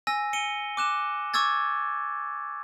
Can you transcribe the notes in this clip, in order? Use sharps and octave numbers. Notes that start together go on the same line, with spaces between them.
G#5 E6 A#6
C#7 D#7 G7
D6 F#6 E7
C#6 D6 E6 G#6 A6